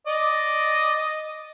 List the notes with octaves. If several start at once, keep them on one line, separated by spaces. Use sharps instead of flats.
D5 D#5